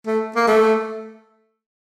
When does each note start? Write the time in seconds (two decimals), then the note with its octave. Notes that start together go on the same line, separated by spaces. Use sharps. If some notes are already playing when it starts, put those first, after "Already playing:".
0.07 A3
0.36 A#3
0.48 A3